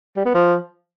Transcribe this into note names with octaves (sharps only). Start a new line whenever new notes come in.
G3
B3
F3